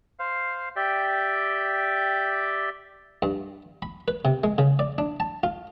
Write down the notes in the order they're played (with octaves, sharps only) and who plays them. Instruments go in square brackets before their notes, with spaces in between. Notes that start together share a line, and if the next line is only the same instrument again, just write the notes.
[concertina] C5 F5
G4 D5 E5 G5
[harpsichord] G2
B5
B4
C3
G#3
C#3
D5
D4
A5
F4